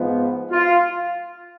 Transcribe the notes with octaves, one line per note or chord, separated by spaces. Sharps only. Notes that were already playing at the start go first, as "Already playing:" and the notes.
Already playing: G#2 F3 B3
F4